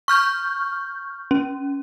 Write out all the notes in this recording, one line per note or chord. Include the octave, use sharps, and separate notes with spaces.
C#6 F6 G6
C#4